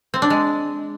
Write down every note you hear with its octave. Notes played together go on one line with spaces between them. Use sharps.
C4
D4
G#3